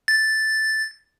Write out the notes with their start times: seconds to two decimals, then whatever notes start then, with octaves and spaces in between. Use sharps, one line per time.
0.08 A6